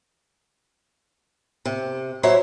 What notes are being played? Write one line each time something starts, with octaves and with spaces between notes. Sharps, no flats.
C3
F#3 E4 C5 C#5 E5